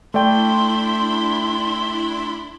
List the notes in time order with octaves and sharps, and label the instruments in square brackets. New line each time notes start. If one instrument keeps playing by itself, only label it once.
[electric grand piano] A3 D5 G5 [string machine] D4 E4 B5 [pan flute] C6